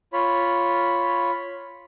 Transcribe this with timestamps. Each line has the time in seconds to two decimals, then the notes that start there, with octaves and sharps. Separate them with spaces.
0.13 F4 C#5 B5